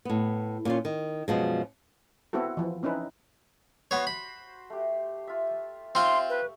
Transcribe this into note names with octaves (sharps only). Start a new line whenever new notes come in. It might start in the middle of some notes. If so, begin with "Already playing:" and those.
A2 B3
A#2 C#4 F4
D#3
F#2 B2 F3 G#3
B3 C4 E4 F#4 A4
E3 F3
C4 C#4 D#4 E4 B4
B3 F#4 C5 C#5
B5
A3 G4
F4 E5
C4 F4 E5 C6 C#6
B4